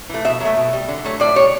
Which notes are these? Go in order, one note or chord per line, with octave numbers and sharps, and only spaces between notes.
E3 A3
B2 E5
F#3 A3
B2
G3
D3
F#3 A3
A2 D5
G3 C#5